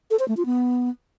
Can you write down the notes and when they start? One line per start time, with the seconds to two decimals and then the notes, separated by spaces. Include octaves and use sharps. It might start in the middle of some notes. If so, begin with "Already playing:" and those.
0.11 A4
0.19 C5
0.28 A3
0.37 F4
0.46 B3